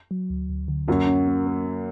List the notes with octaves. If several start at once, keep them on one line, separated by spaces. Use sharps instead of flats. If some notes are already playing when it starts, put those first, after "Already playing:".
F#3
D2
D2
D3
F#2 F#3 A#3
C#4
A#3
A#3
A#3